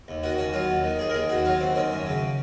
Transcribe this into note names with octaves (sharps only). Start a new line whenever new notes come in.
D#2
D#3 F#4
D#2 C#4
F#3 F4
D#2
D#3
D#2 G#4
A#4
D#3 G#4
D#2 F#4
F#3 F4
D#2 C4
D#3 C#4
F#2
C#3